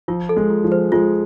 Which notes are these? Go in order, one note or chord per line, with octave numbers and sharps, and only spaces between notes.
F3 F4
A4
G#3
F4
F3
C5
G#3 F4